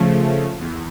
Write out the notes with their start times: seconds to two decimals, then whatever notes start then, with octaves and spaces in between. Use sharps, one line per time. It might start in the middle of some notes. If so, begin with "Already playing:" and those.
Already playing: C#3 F3 A3
0.60 E2